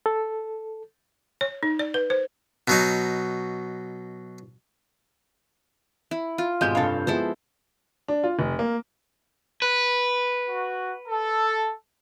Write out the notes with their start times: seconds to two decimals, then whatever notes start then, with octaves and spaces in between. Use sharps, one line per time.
0.06 A4
1.41 C#5
1.63 D#4
1.79 D5
1.94 B4
2.10 C5
2.68 B2 F#3 D#4
6.11 E4
6.38 F4
6.61 G#1 B2 G#3 G4 G6
6.75 F1 G2 A4 C#5 F5
7.07 F3 G#3 B3 E4 A4 C5
8.08 D4
8.24 F4
8.39 F1
8.59 A#3
9.62 B4
10.48 F#4
11.07 A4